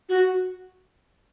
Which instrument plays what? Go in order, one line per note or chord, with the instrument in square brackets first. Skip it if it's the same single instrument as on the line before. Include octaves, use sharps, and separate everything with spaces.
[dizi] F#4